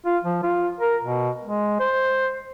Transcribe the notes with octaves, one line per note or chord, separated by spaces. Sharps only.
F4
F3
F4
A#4
B2
G#3
C5